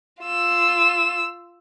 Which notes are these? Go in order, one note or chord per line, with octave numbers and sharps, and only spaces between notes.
F4 E6